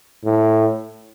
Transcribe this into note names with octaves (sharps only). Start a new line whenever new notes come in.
A2